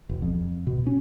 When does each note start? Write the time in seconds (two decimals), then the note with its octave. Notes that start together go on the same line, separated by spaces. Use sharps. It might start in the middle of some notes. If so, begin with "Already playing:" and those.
0.09 E1
0.22 F2
0.67 B2
0.87 C#4